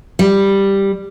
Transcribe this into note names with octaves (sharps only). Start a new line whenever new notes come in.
G3